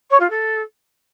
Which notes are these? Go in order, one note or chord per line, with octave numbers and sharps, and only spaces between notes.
C#5
F4
A4